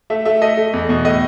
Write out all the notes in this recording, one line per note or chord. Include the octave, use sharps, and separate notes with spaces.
A3 E5
A3 E5
A3 D#5
A3
E2
B2
A2 D#5